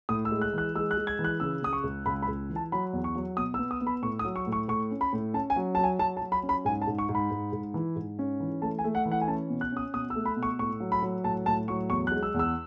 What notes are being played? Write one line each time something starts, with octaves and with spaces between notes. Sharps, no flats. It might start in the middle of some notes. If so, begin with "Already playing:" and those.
A2 D#6
E6
G#3
F#6
E3 F#6
G#3 E6
F#6
G#3
G#6
E3
F#6
C#3 E6
C#3 D#6
C#6
C#2
C#2 B5
B5
C#2
E3
A5
F#3 B5
E2
C#6
F#3
B2 D#6
E6
B3
D#6
B3
B5
A2 C#6
D#6
F#3
C#6
A2
C#6
A2 C#6
C#4
B5
A2
C#4 A5
G#5
F#3
F#3 A5
G#5
F#3 A5
A5
F#3
B5
C#4
B5
G#2 G#5
A5
G#2
C#6
G#2
B5
G#2
G#2
E3
G#2
C#4
E3
A3 A5
G#5
A3
F#5
E3
F#5
G#5
C#4 A5
B2
F#6
C#4 D#6
B2 D#6
E6
A3
B5
B2
C#6
A2 C#6
F#3
B5
F#3
A2 A5
A2 A5
F#3 C#6
E2 C#6
F#6
G#3
E6
E2
E6